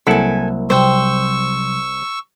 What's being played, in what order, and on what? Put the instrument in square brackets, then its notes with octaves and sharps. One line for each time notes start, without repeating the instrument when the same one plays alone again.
[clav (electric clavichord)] C2 E4 F#5 [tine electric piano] F#3 A#3 A#4 [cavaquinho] A4 G#5
[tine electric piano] C3 F#3 G3 [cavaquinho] C5 G5 [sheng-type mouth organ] C#6 E6